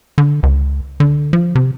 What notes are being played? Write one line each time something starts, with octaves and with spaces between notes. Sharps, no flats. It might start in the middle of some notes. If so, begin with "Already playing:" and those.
D3
C#2
D3
F3
C3